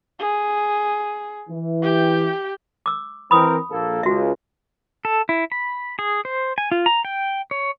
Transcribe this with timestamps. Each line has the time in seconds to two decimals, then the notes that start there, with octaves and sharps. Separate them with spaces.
0.19 G#4
1.48 E3
1.82 G4 G5
2.86 D6 E6
3.31 E3 C4 A#4 B5 D#6
3.71 A#1 A#3 A4
4.03 C#2 F#4 E5
5.05 A4
5.29 E4
5.52 B5
5.99 G#4
6.25 C5
6.58 G#5
6.72 F4
6.86 A#5
7.05 G5
7.51 C#5